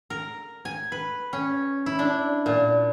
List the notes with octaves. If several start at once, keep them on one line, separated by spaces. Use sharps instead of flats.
A#4
G#5
B4
C#4
E4
D4
A#2